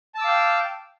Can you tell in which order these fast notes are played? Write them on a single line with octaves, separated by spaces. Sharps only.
A5 E6 D6 F5 G5